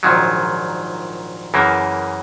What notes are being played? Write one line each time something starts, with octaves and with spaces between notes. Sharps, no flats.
A#1 G#2 D#3 F#3
F#2 C#3 E3 A#3